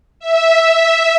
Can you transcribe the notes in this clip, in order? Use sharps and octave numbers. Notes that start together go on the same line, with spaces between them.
E5
E5